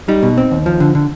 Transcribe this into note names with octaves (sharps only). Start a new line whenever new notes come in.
G3 D#4
B2
C4
D#2
F3
D3
D3